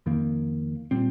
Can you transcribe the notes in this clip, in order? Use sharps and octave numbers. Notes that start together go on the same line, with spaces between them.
F2 D#3 A#3
A#2 G3 C4